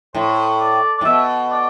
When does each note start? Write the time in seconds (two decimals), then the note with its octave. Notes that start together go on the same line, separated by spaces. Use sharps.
0.14 A2 C5
0.60 D5
0.98 D5
1.01 A2
1.05 B2 E5
1.51 D5